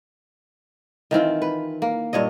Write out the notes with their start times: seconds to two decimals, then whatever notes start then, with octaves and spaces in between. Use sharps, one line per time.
1.11 D#3 E3 C4 F4
1.42 B4
1.82 A#3
2.13 G2 A#2 C#5 D#5